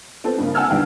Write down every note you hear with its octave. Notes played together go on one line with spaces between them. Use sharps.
B3 C4 A4
G2 C#3 A#3
F#5 G#5 A5 E6 F6 G#6
D#2 D3 G3 B3 F5 G5